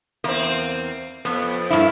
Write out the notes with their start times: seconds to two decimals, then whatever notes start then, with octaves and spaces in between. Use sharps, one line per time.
0.24 E2 A#3 C4
1.25 F2 B3
1.70 G2 E4